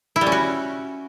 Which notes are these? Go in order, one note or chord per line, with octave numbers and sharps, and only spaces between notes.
E4
G3
C#4
F#4